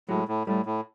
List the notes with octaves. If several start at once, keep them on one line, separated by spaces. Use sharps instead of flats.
A2 F#3 G#3
A2
A2 G3 A3
A2